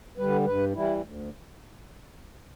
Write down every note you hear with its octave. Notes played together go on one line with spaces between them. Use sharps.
D3 G3 B4
G2 B4
E3 G3 E4
D2